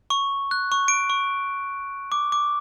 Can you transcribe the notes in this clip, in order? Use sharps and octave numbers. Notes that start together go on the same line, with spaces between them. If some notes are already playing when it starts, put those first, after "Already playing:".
C#6
F#6
C#6
D7
C#6
D6
D6